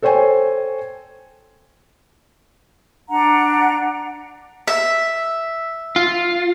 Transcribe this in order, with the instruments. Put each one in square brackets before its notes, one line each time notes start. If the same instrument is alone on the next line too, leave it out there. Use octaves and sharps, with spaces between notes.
[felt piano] A4 C5 C#5 G5 G#5
[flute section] D4 F#5 A#5
[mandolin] E5
[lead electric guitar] F4